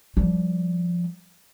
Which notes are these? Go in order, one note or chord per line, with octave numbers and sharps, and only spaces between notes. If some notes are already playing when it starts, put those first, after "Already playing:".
F3 G3